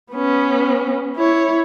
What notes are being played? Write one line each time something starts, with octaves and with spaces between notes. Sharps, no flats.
B3 C#4
E4 C#5